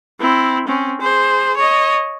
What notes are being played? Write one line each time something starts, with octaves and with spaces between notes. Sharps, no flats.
C4 E4
C4 C#4
G#4 C5
C#5 D#5